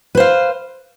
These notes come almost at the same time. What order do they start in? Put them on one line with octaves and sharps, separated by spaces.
B4 C5 F5